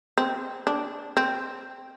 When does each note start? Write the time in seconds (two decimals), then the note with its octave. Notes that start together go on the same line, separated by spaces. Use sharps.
0.18 C4
0.67 D4
1.17 C4